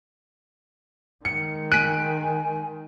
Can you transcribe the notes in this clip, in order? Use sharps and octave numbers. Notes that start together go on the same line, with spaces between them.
D#3 G#3 C#7
G#5 F#6 B6 D7 D#7